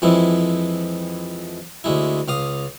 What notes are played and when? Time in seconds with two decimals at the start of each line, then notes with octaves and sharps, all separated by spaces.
0.02 F2 E3 F3 G#3 E4
1.84 D2 G#3 E4
2.28 C#2 F5 D#6